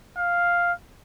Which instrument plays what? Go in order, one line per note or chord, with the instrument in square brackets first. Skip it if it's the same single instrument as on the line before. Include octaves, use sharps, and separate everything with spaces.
[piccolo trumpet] F5